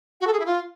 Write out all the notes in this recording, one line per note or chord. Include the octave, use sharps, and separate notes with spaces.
F#4
A4
G#4
E4
F4